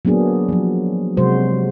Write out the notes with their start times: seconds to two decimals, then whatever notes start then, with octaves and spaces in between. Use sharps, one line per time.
0.05 F#3 A#3 B3 D4 G#4
0.49 F3 F#3
1.17 C3 F#3 G#3 F#4 C5